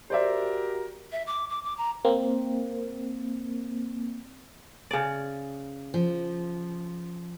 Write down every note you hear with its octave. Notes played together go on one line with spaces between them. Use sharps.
F#4 G4 A#4 C5 D5 E5
E5
D6
D6
D6
A#5
A#3 C4
C#3 D5
F3